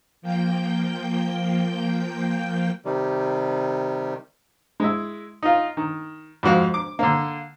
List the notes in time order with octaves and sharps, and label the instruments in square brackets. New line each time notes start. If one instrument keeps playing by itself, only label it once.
[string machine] F3 A#3 G5 G6
[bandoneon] C3 D#3 G3
[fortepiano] G#3 E4
D#4 F4
D#3
F2 G#2 F#4 F5
D6
D3 A#3